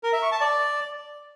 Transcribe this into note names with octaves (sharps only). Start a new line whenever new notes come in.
A#4
E5
C#6
A5
D5